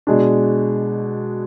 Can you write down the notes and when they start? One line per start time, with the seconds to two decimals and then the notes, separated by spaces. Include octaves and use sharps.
0.07 B2 G#3 D4